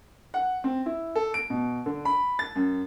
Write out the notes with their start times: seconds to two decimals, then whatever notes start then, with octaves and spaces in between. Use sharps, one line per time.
0.34 F#5
0.64 C4
0.86 E4
1.16 A4
1.34 D7
1.50 B2
1.86 D3
2.05 B5
2.39 A6
2.56 F#2